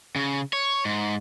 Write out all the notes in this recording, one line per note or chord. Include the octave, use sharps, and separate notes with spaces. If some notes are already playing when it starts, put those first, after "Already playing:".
C#3
C#5
G#2